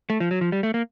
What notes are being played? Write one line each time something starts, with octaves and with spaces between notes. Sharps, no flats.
A3
F3
F#3
F3
G3
A3
A#3